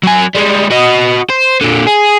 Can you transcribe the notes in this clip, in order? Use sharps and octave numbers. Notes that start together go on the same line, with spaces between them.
F#3 G#5
G3 G#3
F#4 D#5
C5
A#2 D3
G#4